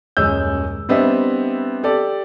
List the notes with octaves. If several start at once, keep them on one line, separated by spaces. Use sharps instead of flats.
D#1 F#2 G#3 C#5 E6 G6
G3 B3 C4 D4 D#5 E5
G4 A4 D5